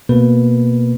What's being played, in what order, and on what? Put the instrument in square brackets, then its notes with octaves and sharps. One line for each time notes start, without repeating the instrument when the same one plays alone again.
[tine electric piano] B2 A#3 B4